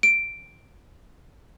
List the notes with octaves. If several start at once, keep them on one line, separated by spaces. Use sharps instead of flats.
D7